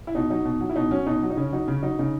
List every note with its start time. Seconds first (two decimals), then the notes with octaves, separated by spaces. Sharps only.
0.07 E4
0.15 B2 D#4
0.30 F#3 D#4
0.45 B2
0.61 F#3
0.69 E4
0.76 B2 D#4
0.91 F#3 C#4
1.07 B2 D#4
1.23 F#3
1.30 D#4
1.37 C#3 C#4
1.52 F#3 D#4
1.67 C#3 C#4
1.83 F#3 D#4
1.99 C#3 D#4